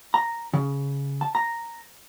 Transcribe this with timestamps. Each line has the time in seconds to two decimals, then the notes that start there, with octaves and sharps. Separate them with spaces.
0.14 A#5
0.54 C#3
1.21 A5
1.35 A#5